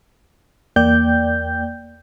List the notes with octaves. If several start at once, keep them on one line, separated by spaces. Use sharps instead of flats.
E2 A#3 D5 G5 G6